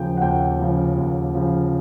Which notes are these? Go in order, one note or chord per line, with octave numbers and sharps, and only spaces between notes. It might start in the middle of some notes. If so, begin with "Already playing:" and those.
Already playing: D#2 C#3 F3 G5
F#5
D#2 G5
C#3 F3
D#2
C#3 F3